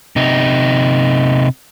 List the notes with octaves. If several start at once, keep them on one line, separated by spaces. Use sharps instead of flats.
C3 D#4